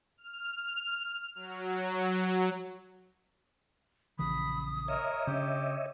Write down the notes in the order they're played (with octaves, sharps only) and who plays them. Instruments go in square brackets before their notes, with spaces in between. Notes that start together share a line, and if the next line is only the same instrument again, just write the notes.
[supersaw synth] F6
F#3
[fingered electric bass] A#1 C#3 E3 [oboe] B5 [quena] D#6
[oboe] A#4 [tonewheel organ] C#5 D#5 E5
[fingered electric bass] C#3 C#4 D4 [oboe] G4